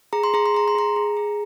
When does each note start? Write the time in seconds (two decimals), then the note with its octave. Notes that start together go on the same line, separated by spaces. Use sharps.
0.13 G#4 A#5
0.24 C6
0.34 G#4 A#5
0.46 C6
0.54 G#4 A#5
0.68 C6
0.75 G#4 A#5
0.96 G#4
1.17 G#4